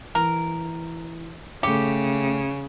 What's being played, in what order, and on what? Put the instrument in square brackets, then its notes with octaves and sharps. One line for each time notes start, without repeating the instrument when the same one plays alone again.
[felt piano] E3 [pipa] A#4
[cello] C#3 [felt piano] A3 C#7 [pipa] G4